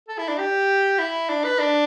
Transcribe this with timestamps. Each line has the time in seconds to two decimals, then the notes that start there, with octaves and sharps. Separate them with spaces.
0.09 A4
0.18 E4
0.28 D4
0.38 G4
0.99 E4
1.29 D4
1.44 B4
1.59 D4